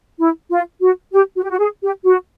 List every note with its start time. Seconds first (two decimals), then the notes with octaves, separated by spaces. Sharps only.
0.19 E4
0.50 F4
0.81 F#4
1.12 G4
1.36 F#4
1.43 G4
1.50 F#4
1.59 G#4
1.83 G4
2.05 F#4